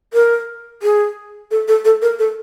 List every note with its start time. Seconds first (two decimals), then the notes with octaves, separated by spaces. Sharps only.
0.14 A#4
0.83 G#4
1.51 A4
1.68 A4
1.85 A4
2.02 A#4
2.19 A4